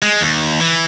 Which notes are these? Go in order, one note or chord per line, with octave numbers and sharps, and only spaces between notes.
G#3
D#2
E3